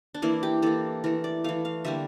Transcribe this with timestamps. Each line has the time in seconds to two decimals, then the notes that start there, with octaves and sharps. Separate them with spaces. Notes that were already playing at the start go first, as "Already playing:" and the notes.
0.14 D4
0.22 E3 A#3 E4
0.43 G4
0.62 E3 A#3 A4
1.04 E3 A3 A#4
1.24 D5
1.44 E3 A3 F5
1.65 F5
1.85 D3 G3 A#3 E5